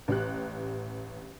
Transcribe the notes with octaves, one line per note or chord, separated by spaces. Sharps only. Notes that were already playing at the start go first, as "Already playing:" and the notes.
A1 G4 F#6